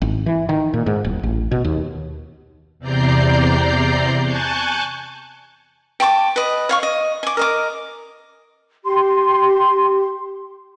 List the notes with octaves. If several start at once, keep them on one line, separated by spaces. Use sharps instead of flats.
G#1
E3
D#3
A#2
G#2
D1
A1
B2
D#2
E2 C3 D5 A#5 G6 C7
G#5 A5 C#6 F#6 G6 A6
G5 A5 C#6 D6
B4 D#5
C#5 F5 C#6
D#5
G#5 D6
A#4 D#5 D6
G4 C6